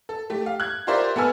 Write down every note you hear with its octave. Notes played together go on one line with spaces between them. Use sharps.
A4
A3 G4
F5
F#6 G#6
F4 G4 A#4 C5 D5 E5
B3 A4 B4 G#5 E6 F6